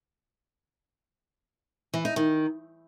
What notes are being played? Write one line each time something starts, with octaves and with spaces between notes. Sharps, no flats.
E3
D#4
D#3